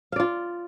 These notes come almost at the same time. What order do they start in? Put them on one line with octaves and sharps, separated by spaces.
F5 D5 F4